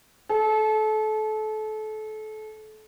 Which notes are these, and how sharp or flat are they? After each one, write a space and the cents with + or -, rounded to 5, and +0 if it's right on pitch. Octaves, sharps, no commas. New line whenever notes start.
A4 -30